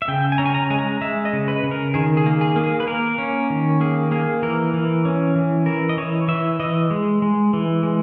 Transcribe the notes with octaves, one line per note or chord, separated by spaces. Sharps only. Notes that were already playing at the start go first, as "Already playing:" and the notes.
E5
C#3 G5
G#5
C#4 A#5
G#5
A#5
G#3 G#5
A#5
G#3 E5
D#5
C#3
B4
C#3
A#4
D#3 G#4
G#4
A#3
G#4
A#3
G#4
B4
A#3 A#4
C#4
D#3
A#3 G#4
A#3 G#4
E3 A#4
E3
C#4
E3
E3 A#4
D#5
E3 C#5
E3 E5
E3 D#5
G#3
G#3
E3
G#3